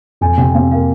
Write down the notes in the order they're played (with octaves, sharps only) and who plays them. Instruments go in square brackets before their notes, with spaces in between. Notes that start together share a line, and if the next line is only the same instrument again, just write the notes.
[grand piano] F2 [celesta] G#5
[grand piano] C3 [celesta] G5
[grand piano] C3 [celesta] F5
[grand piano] A#3 [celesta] F5